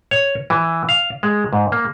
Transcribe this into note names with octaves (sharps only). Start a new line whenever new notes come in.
C#5
E3
F5
G#3
G#2
A#3